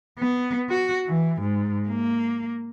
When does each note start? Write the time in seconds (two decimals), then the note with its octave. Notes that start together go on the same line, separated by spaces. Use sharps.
0.18 B3
0.69 F#4
1.08 E3
1.41 G#2
1.88 A#3